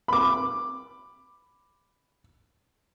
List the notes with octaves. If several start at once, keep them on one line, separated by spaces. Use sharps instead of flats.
B5 D6